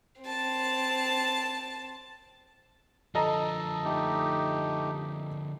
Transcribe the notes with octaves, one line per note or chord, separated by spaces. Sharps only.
C4 A5
D3 F3 A4 D#5 A#5
A3 D#4 G4